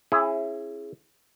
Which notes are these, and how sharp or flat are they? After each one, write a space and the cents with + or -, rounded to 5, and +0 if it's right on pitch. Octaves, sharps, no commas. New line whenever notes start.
C#4 -35 E4 +15 G#4 +0